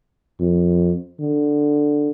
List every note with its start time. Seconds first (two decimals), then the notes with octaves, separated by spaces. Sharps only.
0.40 F2
1.20 D3